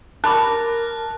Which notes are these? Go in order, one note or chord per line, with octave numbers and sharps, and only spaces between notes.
G4 A#4 A5 B5 D6 F#6